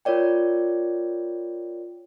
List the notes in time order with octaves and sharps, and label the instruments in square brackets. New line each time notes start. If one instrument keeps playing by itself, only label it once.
[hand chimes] F4 A#4 C#5 D5 G5